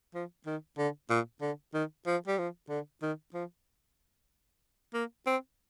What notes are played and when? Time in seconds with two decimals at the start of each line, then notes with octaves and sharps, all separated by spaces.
0.14 F3
0.46 D#3
0.78 D3
1.10 A#2
1.41 D3
1.74 D#3
2.07 F3
2.27 G3
2.38 F3
2.70 D3
3.02 D#3
3.34 F3
4.94 A#3
5.27 C4